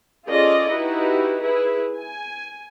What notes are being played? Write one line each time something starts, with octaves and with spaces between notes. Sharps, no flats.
C#4 F4 G#4 A4 D5 D#5
D#4 E4 F#4 G4 B4
E4 G#4 B4
G#5